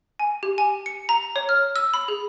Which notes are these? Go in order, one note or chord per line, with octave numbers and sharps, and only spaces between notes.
G#5
G4
G#5
C#7
A#5
C#5
F6
E6
B5
G#4